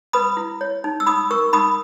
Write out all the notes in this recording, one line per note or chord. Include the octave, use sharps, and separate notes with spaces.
B4 B5 D#6
E4
C#5
D#4
E6
D#4 B5 D#6
A#4 C#6 E6
D#4 B5 D#6